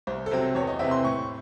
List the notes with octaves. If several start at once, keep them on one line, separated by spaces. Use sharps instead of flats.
C2 C5
A4
C3 F#3 C4 C5
E2 C#5
D#5
C3 E3 C4 E5
C6
A2 C#6